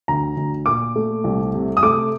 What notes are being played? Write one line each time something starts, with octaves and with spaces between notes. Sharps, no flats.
D2 A#5
D2
A#2 D6
A3
C2
C3
D#6
A3 D6